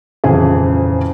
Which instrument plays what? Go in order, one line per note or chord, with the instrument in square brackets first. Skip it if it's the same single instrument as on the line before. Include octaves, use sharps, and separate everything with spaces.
[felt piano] D#1 F2 C#3 E3 G#4